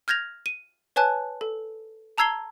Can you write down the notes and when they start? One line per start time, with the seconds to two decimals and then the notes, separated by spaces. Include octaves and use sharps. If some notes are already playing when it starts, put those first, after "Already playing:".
0.08 F6 G6 G#6 A#6 F7
0.46 D#7
0.96 B4 C#5 G#5 A5 F#6
1.41 A4
2.18 A5 A#5 E6 G#6 C7 G7